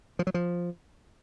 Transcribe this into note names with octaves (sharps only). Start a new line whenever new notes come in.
F3
F#3
F3